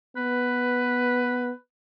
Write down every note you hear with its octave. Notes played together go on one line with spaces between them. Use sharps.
B3 B4